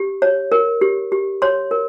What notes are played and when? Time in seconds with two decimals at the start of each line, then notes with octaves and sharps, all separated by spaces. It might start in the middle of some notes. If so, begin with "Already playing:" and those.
Already playing: G4
0.22 C#5
0.52 A#4
0.81 G4
1.12 G4
1.42 C#5 C6
1.71 A#4